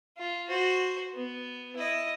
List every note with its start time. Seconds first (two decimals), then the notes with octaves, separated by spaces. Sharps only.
0.17 F4
0.48 F#4 C5
1.14 B3
1.76 E4 D#5